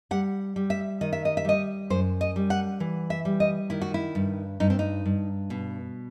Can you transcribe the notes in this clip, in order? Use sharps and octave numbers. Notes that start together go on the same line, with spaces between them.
G3 F#5
G3
E5
D#3 D#5
E5
D#5
E5
G3 D#5
F#2 C5
D#5
G3
F#5
E3
E5
G3
D#5
D#3 E4
F#4
E4
G2
G2 D#4
C4
D#4
G2
B2